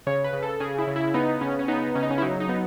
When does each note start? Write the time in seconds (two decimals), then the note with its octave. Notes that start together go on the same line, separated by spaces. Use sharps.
0.07 C#3 C#5
0.24 B4
0.33 C#3
0.43 A4
0.60 C#3 G#4
0.78 E4
0.87 C#3
0.96 E4
1.14 B3 D#4
1.41 C#3 C#4
1.59 C#4
1.68 B3 D#4
1.95 C#3 C#4
2.03 D#4
2.11 C#4
2.18 E4
2.22 F#3 D#4
2.40 D#4
2.49 B3